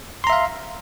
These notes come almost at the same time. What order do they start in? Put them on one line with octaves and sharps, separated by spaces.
C6 A#5 E5 F5